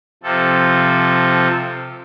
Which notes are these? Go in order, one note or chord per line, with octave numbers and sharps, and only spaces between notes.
C3 F3 A4